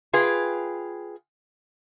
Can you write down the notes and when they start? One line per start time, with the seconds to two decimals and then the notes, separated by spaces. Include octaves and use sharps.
0.13 F4 G#4 B4 G5